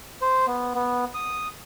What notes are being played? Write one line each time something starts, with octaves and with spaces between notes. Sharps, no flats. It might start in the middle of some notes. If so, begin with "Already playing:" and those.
C5
B3
B3
D#6